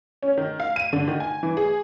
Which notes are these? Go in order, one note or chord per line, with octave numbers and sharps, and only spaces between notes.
C#4
D#3
F5
D#7
D3
D#3
G#5
E3
G#4